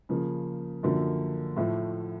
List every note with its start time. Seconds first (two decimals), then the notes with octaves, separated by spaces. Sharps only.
0.09 C#3 F3 A#3
0.83 F#2 D3 F3 A#3
1.56 A2 F3 A3